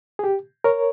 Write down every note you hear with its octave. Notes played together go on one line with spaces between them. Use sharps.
G#4
G4
A#4 C#5